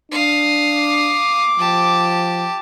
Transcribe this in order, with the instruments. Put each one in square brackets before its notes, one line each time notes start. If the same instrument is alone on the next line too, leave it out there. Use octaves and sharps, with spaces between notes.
[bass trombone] D4 [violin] F5 D#6
[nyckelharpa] D6
[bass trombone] F3 [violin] G4 A5